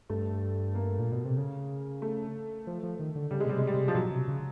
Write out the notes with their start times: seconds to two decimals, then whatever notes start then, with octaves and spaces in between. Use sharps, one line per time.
0.10 G2 A3
0.75 A#3
0.99 A#2
1.12 B2
1.25 C3
1.38 C#3
2.02 A3
2.67 F3
2.83 F3
2.99 D#3
3.16 D3
3.31 C#3 G3
3.40 G#3
3.46 B2
3.49 C3 G3
3.58 G#3
3.67 G3
3.74 C3
3.88 F3
3.95 B2 F#3
4.11 C3
4.28 C#3